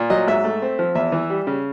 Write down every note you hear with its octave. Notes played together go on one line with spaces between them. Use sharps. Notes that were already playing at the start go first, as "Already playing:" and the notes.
Already playing: A#2
F#3 D#5
G#2 E5
A3
C4
F3
E2 E5
E3
G3
C#3